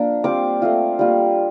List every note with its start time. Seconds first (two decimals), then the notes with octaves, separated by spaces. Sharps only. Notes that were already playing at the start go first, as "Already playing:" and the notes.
Already playing: F3 A#3 D4
0.24 G3 C4 F4 D6
0.62 A3 C4 F4
0.99 G3 A#3 F4